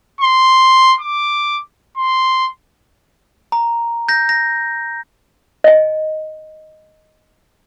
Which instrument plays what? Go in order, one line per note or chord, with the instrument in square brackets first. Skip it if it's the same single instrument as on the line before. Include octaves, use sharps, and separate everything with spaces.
[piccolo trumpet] C6
D6
C6
[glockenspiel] A#5
G6 A#6
A#6
[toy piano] D#5 G#5